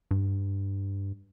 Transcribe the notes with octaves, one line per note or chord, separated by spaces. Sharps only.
G2